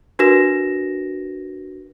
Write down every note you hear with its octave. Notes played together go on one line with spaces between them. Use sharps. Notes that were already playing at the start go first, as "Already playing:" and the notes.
D4 F#4 A#4 B4 A#6 E7